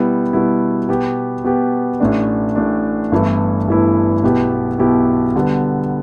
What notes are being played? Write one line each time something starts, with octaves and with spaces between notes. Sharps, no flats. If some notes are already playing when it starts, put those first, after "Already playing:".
Already playing: B2 G3 B3 E4
B2 G3 B3 E4
B2 B3 G4
B2 B3 G4
A1 A2 A3 D4
A1 A2 A3 D4
G1 G2 E3 A3 E4
G1 G2 E3 A3 E4
B1 B2 B3 E4 G4
B1 B2 B3 E4 G4
D3 G3 B3